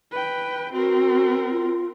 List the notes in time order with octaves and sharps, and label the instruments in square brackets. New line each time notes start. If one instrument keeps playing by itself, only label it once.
[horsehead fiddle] B4 G5
[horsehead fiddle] C4 A#4 [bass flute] F#4
[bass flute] F4